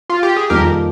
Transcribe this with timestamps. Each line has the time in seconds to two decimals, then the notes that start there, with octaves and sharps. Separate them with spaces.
0.10 F4
0.23 G4
0.36 G#4
0.50 F2 D#3 G3 A#3 F4 G4 A#4